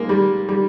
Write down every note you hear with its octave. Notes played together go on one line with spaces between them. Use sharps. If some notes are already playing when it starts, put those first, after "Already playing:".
Already playing: G#3 A#3
G3
G3